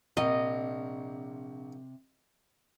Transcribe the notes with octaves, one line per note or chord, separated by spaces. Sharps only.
A#1 C3 D#5